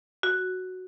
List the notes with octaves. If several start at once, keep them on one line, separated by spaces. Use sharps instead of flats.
F#4